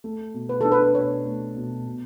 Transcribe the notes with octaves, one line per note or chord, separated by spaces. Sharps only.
A3
B2
B4
D4 A4
B4
B2 C#5
A3
B2
B2